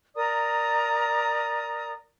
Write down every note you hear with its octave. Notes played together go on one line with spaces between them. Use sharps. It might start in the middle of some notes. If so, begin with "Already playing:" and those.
A#4 D5 A#5 D#6